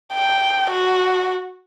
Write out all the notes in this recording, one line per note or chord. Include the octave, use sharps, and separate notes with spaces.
G5
F#4